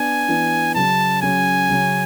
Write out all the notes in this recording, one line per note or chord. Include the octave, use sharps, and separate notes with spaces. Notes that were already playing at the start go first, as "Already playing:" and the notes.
Already playing: B3 D4 G#5
E3 B3 D4
C#3 F#3 C#4 A5
C#3 F#3 C#4 G#5
C#3 F#3 C#4